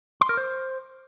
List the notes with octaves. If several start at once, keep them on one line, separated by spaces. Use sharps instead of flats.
C6
A#4
C5